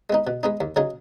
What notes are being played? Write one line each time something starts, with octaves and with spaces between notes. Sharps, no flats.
G#3 B3 D#4
B2
G#3 B3 D#4
D#2
C#3 F#3 D#4 G#4